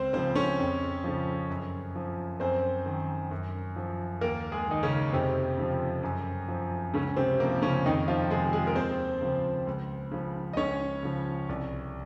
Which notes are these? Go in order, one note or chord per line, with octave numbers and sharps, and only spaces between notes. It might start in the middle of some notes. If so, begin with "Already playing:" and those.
Already playing: C#2 C4 C5
C#3 F3 C4 C5
C#4 C#5
F2
C#3 F3
F#2
F3
F#2 C4 C5
D#3
F#2
F3
D#2 A#3 A#4
G#3 G#4
D#3 D#4
C#3 C#4
F2 C3 C4
C#3 F3
F#2
F3
C#2 C#3 C#4
C3 C4
C3 F3 A#3
C#3 C#4
F2 D#3 D#4
F3 F4
C3 D#3 G#3 G#4
G#3 G#4
A#4
D#2 C4 C5
C#3 F3
C#2
C#3 F3
D#5
C#2 C#4 C#5
C#3 F3
C2